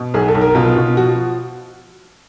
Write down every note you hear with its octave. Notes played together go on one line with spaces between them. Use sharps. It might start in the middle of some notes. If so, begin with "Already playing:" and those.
Already playing: B2
B1 G#4
A4
B1
A#4
B2 F4
B2
F3 F#4